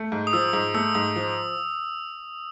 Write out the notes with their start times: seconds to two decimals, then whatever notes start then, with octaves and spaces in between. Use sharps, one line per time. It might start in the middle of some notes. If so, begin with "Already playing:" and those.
Already playing: A3
0.12 G#2
0.27 D#6
0.33 F3 E6
0.53 G#2
0.74 A3 E6
0.95 G#2 D#6
1.16 F3